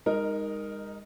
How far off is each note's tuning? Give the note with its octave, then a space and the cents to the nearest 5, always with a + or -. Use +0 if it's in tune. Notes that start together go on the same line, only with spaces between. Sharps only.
G#3 -35 D#4 +0 A#4 +0